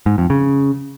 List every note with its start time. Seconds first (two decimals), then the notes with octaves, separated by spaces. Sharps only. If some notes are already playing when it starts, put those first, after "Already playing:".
0.06 G#2
0.18 F2
0.30 C#3